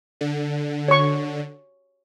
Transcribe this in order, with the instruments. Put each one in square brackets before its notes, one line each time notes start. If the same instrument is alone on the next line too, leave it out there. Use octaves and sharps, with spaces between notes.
[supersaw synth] D3
[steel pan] C#5 C#6